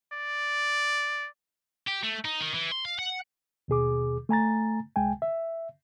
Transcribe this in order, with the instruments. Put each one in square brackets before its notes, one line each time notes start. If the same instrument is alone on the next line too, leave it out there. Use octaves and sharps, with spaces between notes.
[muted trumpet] D5
[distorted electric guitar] G4
A3
D#4
D#3
E3
C6
F5
F#5
[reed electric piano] D#2 B2 G#4 D6
A3 G#5 A#5 A6
C2 G#3 G5 G#5
E5